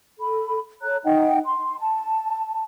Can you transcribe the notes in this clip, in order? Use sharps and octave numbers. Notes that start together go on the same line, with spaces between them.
A4 B5
A4 C#5 A#5 F#6
D#4 D#5 F#5 G5
C6
A5